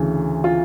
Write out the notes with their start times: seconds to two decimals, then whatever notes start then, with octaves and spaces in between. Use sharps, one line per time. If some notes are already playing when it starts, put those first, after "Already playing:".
Already playing: D2 C#3 E3
0.44 F4